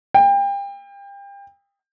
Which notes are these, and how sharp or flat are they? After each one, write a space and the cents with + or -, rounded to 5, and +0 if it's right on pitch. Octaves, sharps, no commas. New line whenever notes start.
G5 +30